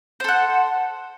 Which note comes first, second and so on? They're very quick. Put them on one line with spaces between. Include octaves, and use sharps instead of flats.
C5 A4 F#5